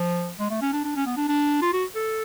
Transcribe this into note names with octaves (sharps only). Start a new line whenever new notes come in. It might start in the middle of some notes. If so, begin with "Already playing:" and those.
Already playing: F3
G#3
A3
C#4
D4
D4
C#4
B3
D4
D4
F4
F#4
A4